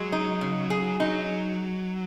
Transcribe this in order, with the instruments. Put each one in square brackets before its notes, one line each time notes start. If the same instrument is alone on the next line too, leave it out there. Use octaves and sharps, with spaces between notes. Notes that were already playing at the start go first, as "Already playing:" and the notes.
Already playing: [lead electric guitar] F#3 [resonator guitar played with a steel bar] G#3
[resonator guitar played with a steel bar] D#4
C#3
G#4
[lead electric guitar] F#3 [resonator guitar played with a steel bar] D#4